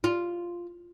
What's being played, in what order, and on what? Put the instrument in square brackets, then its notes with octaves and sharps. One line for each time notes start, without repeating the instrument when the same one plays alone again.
[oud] F4